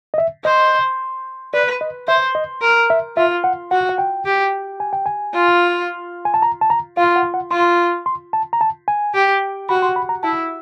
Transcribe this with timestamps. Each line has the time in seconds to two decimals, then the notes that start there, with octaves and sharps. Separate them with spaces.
0.14 D#5
0.18 E5
0.44 C5 D#5
1.54 B4 D5
1.81 D#5
2.08 C5 E5
2.35 D#5
2.62 A#4
2.90 E5
3.17 F4 E5
3.44 F#5
3.71 F#4 F#5
3.89 F#5
3.98 G5
4.26 G4
4.80 G#5
4.93 G5
5.06 G#5
5.34 F4
6.25 G#5
6.34 A5
6.42 A#5
6.61 A5
6.70 A#5
6.97 F4 F5
7.16 F#5
7.34 F#5
7.51 F4 C6
8.06 C6
8.33 A5
8.53 A#5
8.61 A5
8.88 G#5
9.14 G4
9.69 F#4 B5
9.82 C6
9.96 B5
10.09 A#5
10.23 E4 A5